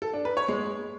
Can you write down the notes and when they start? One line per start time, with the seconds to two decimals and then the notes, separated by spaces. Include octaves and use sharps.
0.02 A4
0.13 D4
0.25 B4
0.37 C#5
0.48 G#3